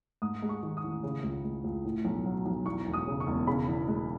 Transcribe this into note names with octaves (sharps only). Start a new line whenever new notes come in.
G#2 D#6
G#3
C#6
D#3
D#6
A1
C#3
C#2
G#3
C#2
A2
B1
F#3
B1
E2 C#6
E1
D#6
C#3
C#6
E1
C#3 B5
E2
G#3